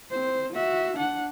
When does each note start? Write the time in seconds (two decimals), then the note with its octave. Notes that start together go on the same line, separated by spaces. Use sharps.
0.11 C4 C5
0.52 F#4 E5
0.96 D4 F#5